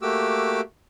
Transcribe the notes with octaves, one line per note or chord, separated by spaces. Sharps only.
A3 A#3 F#4 G4 D6 E6